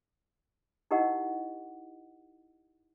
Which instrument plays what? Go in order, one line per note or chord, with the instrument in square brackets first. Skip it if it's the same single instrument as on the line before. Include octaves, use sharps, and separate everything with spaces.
[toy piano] D#4 E4 G4 A#4 D#5 F#5